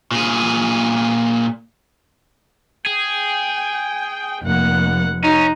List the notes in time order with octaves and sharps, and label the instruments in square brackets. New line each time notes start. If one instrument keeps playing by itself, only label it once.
[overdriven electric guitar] A#2 G#4
[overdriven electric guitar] G#4 [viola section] G5
[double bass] F1 [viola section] A#3 F#5
[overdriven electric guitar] C#4 [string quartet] D#4 [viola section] F#4